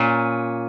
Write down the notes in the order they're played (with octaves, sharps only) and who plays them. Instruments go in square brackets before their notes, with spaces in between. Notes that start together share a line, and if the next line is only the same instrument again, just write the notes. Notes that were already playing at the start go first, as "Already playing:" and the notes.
Already playing: [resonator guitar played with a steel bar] A#2 C#4